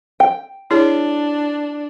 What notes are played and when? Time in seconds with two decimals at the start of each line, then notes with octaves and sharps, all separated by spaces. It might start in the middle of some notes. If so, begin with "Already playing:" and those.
0.20 G5
0.71 D4 E4 G#4 C#5